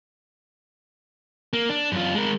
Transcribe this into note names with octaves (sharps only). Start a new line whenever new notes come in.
A#3
D4
F#2 F4
G#3 A#4